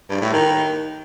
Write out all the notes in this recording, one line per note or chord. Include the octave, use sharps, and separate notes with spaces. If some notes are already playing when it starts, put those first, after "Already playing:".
G2
A2
D#3